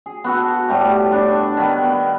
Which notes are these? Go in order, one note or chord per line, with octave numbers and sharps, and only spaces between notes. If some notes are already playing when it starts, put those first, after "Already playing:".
G#4
B3 F#4 A4
A2 G3 A3 G4
D4
D#3 B3
B3